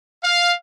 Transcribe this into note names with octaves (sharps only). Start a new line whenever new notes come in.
F5